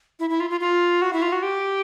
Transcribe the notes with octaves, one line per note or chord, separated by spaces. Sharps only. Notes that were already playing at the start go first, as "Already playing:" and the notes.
E4
E4
F4
F4
F4
F#4
E4
F4
F#4
G4